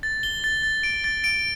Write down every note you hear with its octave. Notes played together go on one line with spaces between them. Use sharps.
A6
G7
A6
A6
D7
A6
D7